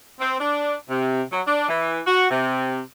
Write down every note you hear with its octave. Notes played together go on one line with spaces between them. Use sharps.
C4
D4
C3
F#3
D4
E3
F#4
C3